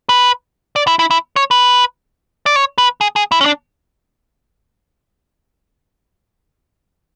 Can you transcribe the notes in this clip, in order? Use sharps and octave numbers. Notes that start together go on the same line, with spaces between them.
B4
D5
E4
E4
E4
C#5
B4
D5
C#5
B4
G#4
G#4
E4
C#4
D4